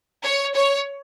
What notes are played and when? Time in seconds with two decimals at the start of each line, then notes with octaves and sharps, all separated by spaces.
0.23 C#5
0.54 C#5